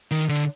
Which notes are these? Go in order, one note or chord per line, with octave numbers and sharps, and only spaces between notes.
D#3
D3